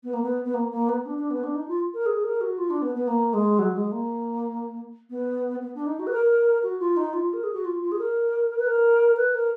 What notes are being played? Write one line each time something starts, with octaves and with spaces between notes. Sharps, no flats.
B3
A#3
B3
B3
A#3
A#3
B3
D4
D4
B3
D4
D#4
F4
A#4
G#4
A#4
F#4
F4
D4
B3
B3
A#3
G#3
F#3
G#3
A#3
B3
B3
D4
D#4
F#4
B4
A#4
F#4
F4
D#4
F4
A#4
G#4
F#4
F4
F4
G#4
A#4
B4
A#4
B4
A#4